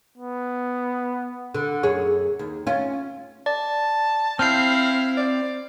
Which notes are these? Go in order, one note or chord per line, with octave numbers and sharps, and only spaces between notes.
B3
D3
F#2 G#4 C#5
D#2
C#4 F4
D5 A5
C4 E4 F5 F6 G6 C7
D5